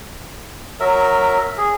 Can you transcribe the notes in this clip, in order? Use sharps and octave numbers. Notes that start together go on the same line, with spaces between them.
F#3 A#4 E5
G#4